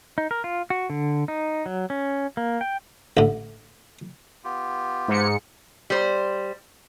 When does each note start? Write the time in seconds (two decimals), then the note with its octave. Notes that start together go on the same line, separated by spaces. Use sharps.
0.18 D#4
0.31 A#4
0.44 F4
0.70 F#4
0.90 D3
1.28 D#4
1.66 F#3
1.90 C#4
2.37 A#3
2.61 G5
3.17 A1 D3
4.44 B3 F4 G4
5.08 G#2 C#7
5.90 G3 C5